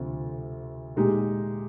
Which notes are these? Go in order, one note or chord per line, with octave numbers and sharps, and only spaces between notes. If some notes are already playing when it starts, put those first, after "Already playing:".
Already playing: D2 C3 F3 C4
A#2 G#3 D#4 G4